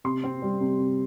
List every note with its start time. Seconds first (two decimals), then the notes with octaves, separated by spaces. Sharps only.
0.04 C3 C6
0.24 C4
0.42 G3
0.60 C3
0.80 C3